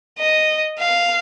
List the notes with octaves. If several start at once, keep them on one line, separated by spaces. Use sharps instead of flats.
D#5
F5